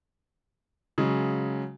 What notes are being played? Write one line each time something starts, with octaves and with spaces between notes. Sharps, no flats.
C#3 F#3 G#3